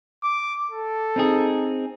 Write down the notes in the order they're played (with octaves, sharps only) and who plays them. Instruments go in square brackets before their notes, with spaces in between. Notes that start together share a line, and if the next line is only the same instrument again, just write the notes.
[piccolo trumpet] D6
A4
[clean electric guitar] C4 D#4 G#4